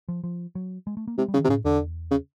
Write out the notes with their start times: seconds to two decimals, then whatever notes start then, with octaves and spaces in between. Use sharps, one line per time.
0.08 F3
0.24 F3
0.55 F#3
0.87 G#3
0.97 A3
1.08 A#3
1.18 C3 G#3
1.28 G3
1.34 C#3
1.39 D#3
1.44 C3
1.49 A2 C#3
1.64 E2 D3
2.11 C#3